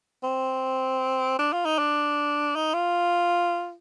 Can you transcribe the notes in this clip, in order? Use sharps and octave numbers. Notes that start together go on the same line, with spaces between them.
C4
D4
F4
D#4
D4
D#4
F4